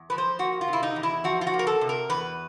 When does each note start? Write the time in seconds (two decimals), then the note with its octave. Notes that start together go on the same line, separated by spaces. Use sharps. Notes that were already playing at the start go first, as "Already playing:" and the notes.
Already playing: E2
0.10 F3 B4
0.18 C5
0.39 A#3 F#4
0.61 F4
0.68 C3
0.73 E4
0.83 D#4
0.96 E2
1.03 E4
1.24 F3 F#4
1.41 F4
1.47 F#4
1.54 A#3
1.59 A#4
1.67 A4
1.81 C3
1.89 A#4
2.09 E2 B4